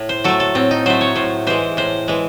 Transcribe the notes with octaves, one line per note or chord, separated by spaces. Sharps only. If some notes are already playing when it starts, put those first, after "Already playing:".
Already playing: A2
C5
F#3 A3 A4
A4
A2 C4
D#4
F#3 A3 C5
C#5
A2 C5
E3 G#3 C5
A2 C5
E3 G#3